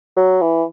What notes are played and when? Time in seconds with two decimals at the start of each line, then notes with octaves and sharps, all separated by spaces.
0.17 F#3
0.41 E3